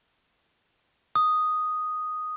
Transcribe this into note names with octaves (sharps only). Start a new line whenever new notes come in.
D#6